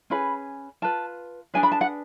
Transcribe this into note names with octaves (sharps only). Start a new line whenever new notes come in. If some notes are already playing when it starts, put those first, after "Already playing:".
C#4 G#4 B4 B5
F4 B4 A5
D4 G#4 B4 G#5
B5
A5
F#5